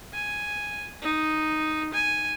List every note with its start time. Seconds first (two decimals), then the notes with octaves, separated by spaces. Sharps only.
0.13 G#5
1.02 D#4
1.94 G#5